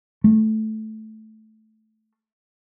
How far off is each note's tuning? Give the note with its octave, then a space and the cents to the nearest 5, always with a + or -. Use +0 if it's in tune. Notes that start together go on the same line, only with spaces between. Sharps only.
A3 -10